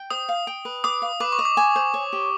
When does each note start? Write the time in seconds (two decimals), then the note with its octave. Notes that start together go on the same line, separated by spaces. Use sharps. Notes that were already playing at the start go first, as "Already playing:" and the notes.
Already playing: G5
0.10 C5 D#6
0.29 F5
0.47 G5
0.65 B4
0.84 D6 D#6
1.02 F5
1.20 B4 D6
1.32 C#6
1.39 D#5
1.45 D6
1.57 G#5
1.76 C5
1.94 C#5
2.13 G4